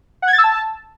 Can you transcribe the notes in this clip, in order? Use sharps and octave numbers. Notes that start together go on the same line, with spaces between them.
F#5
G#6
A6
E6
A5